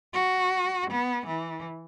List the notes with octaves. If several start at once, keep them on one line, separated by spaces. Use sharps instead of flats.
F#4
B3
E3